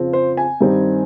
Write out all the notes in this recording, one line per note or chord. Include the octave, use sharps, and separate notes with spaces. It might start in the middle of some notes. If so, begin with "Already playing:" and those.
Already playing: F2 C#3 F3 C4
C5
G#5
G2 D#3 G3 C4 D#4